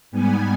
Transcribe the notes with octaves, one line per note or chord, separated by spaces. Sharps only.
G#2 G3 B3 G#5